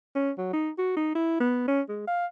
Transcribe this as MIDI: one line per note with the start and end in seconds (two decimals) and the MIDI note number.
0.15 0.31 61
0.38 0.49 54
0.53 0.70 63
0.78 0.95 66
0.96 1.13 63
1.15 1.39 64
1.40 1.63 59
1.68 1.81 61
1.89 2.05 56
2.07 2.26 77